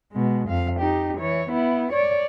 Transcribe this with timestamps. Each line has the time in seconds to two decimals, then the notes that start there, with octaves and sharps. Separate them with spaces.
0.12 B2 G#3
0.49 F2 F5
0.80 D#4 G4
1.18 E3 C#5
1.50 B3 E4
1.92 C#5 D5